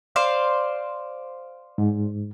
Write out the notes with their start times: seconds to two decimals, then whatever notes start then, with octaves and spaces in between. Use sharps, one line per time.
0.16 C5 D5 F5
1.78 G#2